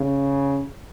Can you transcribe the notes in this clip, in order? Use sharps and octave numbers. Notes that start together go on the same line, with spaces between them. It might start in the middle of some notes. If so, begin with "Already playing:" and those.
Already playing: C#3